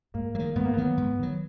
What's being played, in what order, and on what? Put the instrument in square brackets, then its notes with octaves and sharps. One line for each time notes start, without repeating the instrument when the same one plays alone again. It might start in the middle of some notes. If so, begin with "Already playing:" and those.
[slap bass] G#2 [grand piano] A#3
[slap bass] D#3 F#3 [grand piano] A#3
[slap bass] G#2 [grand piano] B3
[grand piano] A#3
[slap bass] D#3 F#3 [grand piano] B3
[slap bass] G#2
D#3 F#3